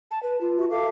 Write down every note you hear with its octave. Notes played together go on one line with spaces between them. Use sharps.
A5
B4
F4
F#4 E5
A4 E5 F5 D6